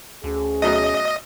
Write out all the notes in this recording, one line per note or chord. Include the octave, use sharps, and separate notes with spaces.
D2 C#4 G#4
B2 F#3 A3 D#5